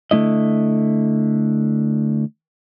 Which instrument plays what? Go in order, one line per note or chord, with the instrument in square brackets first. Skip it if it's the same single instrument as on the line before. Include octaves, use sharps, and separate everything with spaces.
[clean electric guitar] D3 A3 E4 D#5